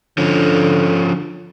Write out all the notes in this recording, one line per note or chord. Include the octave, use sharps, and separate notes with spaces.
D3 F3 C#4